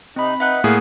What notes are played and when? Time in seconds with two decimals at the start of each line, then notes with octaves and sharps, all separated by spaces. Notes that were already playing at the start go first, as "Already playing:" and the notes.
0.16 C3 C4 D#4 B5
0.40 D#4 B4 E5 F#5 F#6
0.64 A2 A#3 G#4 F5